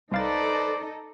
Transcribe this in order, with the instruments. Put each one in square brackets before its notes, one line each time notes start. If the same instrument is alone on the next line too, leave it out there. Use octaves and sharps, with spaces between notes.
[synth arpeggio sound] C2 F5 A6 [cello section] D#4 A4 [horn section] B4 C5 D5